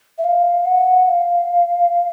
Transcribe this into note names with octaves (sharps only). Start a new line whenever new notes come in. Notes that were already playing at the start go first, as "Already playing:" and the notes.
E5
F5
F#5
F5